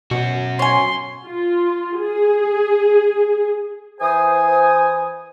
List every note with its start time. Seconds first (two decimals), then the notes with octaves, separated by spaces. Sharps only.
0.11 B2 C#4 F#4
0.59 C#5 G#5 C6
1.25 F4
2.00 G#4
4.01 E3 C5 G#5 D#6